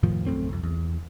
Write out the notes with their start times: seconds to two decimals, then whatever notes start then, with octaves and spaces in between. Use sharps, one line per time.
0.03 F2 A2 D#3 F3
0.26 A#1 F#2 A3 C4
0.49 C2 F2
0.63 E2